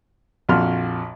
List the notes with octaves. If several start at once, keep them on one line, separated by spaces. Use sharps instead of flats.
A#1 F2 F#4 C6 F6